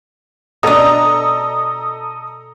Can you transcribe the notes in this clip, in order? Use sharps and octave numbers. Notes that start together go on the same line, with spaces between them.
B2 D4 A4 D#5 A#5 D#6